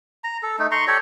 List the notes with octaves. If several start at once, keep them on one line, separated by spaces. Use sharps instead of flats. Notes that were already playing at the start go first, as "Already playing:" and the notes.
A#5
A4
A3 D#4
A#5 C6 C#6
G4 A4 C#5 D5